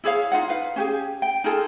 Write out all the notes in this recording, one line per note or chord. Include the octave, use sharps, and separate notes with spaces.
E4 G#4 C#5 F5
D#4 F4 F#5
B4 F5
C#4 G4 G#4
G5
D#4 F4 G#4 A4